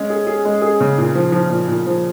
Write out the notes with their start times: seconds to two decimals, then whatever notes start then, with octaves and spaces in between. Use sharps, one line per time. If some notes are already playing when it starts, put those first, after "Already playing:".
Already playing: G#3 C#4
0.10 G#4
0.27 G#4
0.45 G#3
0.62 G#4
0.80 C#3
0.98 A#2
1.15 F3
1.32 F3
1.50 A#2
1.68 A#2
1.86 F3